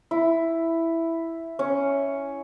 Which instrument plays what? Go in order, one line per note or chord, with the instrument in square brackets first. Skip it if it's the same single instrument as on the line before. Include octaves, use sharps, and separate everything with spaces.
[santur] E4
C#4